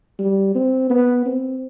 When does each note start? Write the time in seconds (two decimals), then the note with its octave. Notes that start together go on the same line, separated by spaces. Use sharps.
0.19 G3
0.55 C4
0.90 B3
1.26 C4